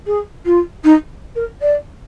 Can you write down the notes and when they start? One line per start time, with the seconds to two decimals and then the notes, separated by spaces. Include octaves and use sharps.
0.06 G#4
0.45 F4
0.84 D#4
1.35 A#4
1.61 D5